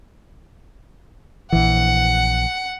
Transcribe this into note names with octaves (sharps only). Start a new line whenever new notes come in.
A#1 E3 F#5